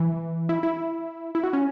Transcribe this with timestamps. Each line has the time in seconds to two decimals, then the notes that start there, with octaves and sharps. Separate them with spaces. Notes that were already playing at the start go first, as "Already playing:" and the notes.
Already playing: E3
0.49 E4
0.63 E4
1.35 E4
1.43 F#4
1.53 C#4